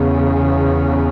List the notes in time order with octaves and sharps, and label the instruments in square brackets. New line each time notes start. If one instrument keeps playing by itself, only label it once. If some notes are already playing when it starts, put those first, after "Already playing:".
Already playing: [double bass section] E2 C#3